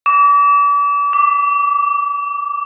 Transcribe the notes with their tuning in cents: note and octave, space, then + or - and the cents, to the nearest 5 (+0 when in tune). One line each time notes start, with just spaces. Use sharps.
D6 -40
D6 +0